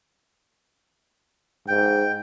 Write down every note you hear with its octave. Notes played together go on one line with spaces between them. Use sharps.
G#2 G5